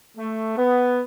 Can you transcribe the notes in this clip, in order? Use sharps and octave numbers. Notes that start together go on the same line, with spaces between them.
A3
B3